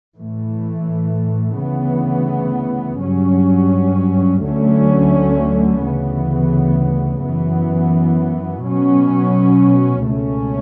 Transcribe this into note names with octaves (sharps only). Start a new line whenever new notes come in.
A2 E3 A3
D2 C#3 E3 B3
G2 F#3 C#4
D2 D3 F#3 A3 C#4
D2 C#3 E3 B3
F#2 E3 B3
B2 F#3 C#4
C#2 B2 A3 C#4